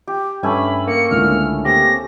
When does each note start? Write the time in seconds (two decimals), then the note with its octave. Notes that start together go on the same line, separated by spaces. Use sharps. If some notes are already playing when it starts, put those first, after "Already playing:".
0.07 G4
0.43 G2 A3 C#4 G#5 B5
0.87 A#3 C#7
1.11 C#2 A2 D3 F6
1.65 A#3 C4 G4 A#6